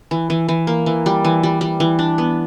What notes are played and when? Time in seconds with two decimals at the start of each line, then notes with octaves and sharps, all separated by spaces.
0.11 E3
0.30 E3
0.49 E3
0.67 A#3
0.86 E3
1.06 G3
1.25 E3
1.43 G3
1.61 G3
1.80 E3
1.99 D4
2.18 B3